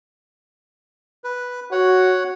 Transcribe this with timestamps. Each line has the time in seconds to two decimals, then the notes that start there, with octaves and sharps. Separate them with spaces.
1.24 B4
1.72 F#4 C#5 F#5